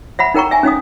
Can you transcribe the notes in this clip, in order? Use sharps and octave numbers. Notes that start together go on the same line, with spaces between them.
E5 F#5 B5
D#4 A#4 G5 A#5 C#6
E5 G#5
C#4 D#4 F5 D#6